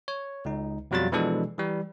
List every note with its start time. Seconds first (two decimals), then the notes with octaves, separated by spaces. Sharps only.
0.08 C#5
0.45 C#2 D#4
0.91 F2 B2 F#3 G3 F4 A6
1.12 B2 E3 F3 G#3 D4 A4
1.58 E3 G3